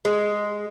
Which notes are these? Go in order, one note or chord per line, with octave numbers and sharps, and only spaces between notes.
G#3